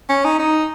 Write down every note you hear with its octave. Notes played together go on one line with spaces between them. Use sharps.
C#4
D#4
D#4